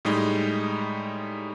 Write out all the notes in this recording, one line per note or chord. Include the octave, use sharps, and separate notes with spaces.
A2 G3 G#3 D#4